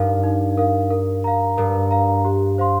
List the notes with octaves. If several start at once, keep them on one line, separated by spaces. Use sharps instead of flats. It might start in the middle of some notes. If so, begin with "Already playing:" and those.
Already playing: G2 D#4 A#4 F5
D#4
A#4 F5
A#4
F5 A#5
G2 A#4
F5 A#5
G4
C5 F5 C6